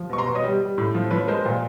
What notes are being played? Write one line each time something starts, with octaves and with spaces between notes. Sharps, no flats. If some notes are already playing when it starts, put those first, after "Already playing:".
Already playing: F3
B2 C#6
A#5 C6
B2
C#5 D#5
G3
G3
A2
F3
F3 B4 C#5
G#3 A#4 C5
A#2